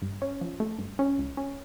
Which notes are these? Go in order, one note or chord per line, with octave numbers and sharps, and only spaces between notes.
G2
C#4
F3
A3
G2
C#4
C#2
C#4